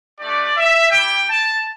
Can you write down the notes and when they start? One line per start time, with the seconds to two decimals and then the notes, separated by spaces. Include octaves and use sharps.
0.19 A3 D4 G4 D5
0.56 E5
0.91 G3 E4 G4 G5
1.28 A5